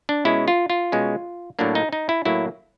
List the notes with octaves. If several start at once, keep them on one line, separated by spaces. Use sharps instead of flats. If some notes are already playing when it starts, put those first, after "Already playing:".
D4
B2 G#3 C#4 E4
F4
F4
B2 G#3 C#4
A2 F#3 A#3 D4
D#4
D#4
E4
A2 F#3 A#3 E4